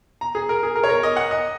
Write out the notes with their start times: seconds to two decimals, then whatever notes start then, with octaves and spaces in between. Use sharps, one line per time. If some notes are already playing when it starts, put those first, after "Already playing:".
0.21 A#5
0.35 G#4
0.49 A#4
0.63 G#4
0.75 A#4
0.84 C#5
0.89 A#4
1.03 D#5
1.16 F#5
1.31 D#5